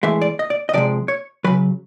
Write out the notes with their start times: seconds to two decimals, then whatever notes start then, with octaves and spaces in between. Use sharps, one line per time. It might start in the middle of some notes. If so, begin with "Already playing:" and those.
0.03 A2 E3 G#3 E5
0.21 D5
0.39 D#5
0.50 D5
0.69 D#5
0.73 C3 F3 G#3 D5
1.08 C#5
1.44 C#3 F#3 B4